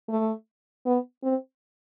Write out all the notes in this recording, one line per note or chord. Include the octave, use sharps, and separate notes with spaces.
A3
B3
C4